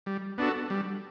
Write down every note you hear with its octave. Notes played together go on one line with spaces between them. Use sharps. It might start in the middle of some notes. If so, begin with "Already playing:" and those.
G3
B3 D4 F#4 A4
G3